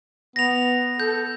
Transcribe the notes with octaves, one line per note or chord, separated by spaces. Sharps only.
B3 A#6 F7
A4 G6